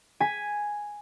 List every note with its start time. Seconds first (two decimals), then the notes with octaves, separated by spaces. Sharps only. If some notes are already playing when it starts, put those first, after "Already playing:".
0.20 G#5 B6